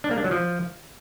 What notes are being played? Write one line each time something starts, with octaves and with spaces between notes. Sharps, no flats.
D4
A#3
D4
F#3
F3